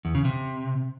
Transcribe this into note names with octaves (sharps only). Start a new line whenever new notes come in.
E2
C#3
C3